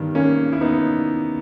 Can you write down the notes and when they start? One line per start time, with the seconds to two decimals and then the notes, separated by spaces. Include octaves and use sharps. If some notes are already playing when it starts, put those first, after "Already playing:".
Already playing: G2 D#3 G3 B3
0.15 A#3 C#4
0.53 E4
0.61 B3 D#4